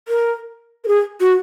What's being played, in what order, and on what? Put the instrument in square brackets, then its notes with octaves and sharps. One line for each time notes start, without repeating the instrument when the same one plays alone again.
[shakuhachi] A#4
A#4
G#4
F#4